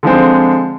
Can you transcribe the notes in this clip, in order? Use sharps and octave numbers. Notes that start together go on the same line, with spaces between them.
D3 F3 G#3 C4